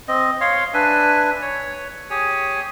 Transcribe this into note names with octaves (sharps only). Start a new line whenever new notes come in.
C4 D#5
C#5 F5 C6
D4 B4 E5 G#5
C#5
G4 G#4 C#5 G#5